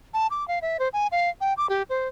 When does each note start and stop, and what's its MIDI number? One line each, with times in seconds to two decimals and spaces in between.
0.14 0.27 81
0.30 0.47 86
0.48 0.59 77
0.62 0.77 76
0.79 0.88 72
0.93 1.07 80
1.12 1.29 77
1.41 1.53 79
1.57 1.67 86
1.69 1.82 67
1.90 2.08 72